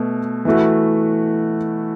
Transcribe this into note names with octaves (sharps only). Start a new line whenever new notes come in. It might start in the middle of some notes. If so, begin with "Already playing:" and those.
Already playing: B2 A3
E3 A3 F#4